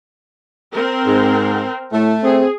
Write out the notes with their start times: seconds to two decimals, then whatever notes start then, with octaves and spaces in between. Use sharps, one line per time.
0.72 C4 A#4
1.06 G#2
1.92 A2 A3
2.23 C4 G#4